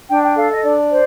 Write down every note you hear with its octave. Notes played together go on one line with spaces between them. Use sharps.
D4 G5
G5
A4 F5
D#5
D4 D5
C5